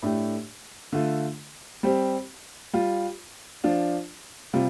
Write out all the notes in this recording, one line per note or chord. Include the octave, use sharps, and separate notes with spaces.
A2 A3 D4 G4
D3 A3 F4
G3 C4 G4
G3 F4
F3 D4 F4
C3 G3 F4